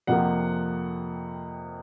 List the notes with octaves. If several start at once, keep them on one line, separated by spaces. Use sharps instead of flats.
F2 C3 F3 A#3 F#5